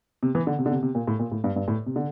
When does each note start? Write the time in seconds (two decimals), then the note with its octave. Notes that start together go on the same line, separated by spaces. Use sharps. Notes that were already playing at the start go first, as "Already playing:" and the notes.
0.23 C3
0.35 E3
0.47 D3
0.59 C3
0.66 D3
0.72 C3
0.83 C3
0.95 A#2
1.07 A2
1.19 A#2
1.32 A2
1.44 G2
1.56 G2
1.68 A2
1.86 C3
1.96 D3